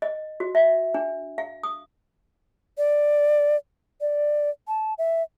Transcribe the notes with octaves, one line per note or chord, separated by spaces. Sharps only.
D#5
F#4
E5
D4
F5
D#6
D5
D5
A5
E5